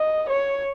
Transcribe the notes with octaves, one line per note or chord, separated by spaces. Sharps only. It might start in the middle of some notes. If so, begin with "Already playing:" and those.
Already playing: D#5
C#5